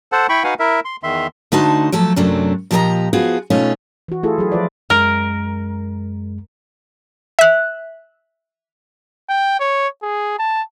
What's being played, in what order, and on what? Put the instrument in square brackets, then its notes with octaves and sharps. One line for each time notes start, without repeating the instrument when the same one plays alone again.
[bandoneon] A4 C5 F#5 A5
E4 G5 B5 C#6
D#4 F#4 B4 F5 F#5 G#5
E4 A#4 E5
C6
E2 D#3 E5 C6
[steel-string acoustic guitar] D3 A3 D#4 F#4 C5 A5
F3 F#3 A3 A4
F#2 C3 F#3 A3 C4 D4
A#2 F3 G4 A#4 D#5 A#5
F3 B3 F4 F#4 G#4
B2 A3 C#4 D#4 F4
[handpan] E3 F#4
A3 E4 F4 G#4 A4
F#3 G#4
F3 F4 B4 D5
[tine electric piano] F#2 G#3 [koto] A#4
[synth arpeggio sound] E5 F#6
[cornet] G5
C#5
G#4
A5